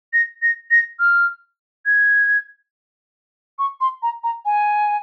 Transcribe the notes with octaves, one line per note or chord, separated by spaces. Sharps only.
A#6
A#6
A#6
F6
G#6
C#6
C6
A#5
A#5
G#5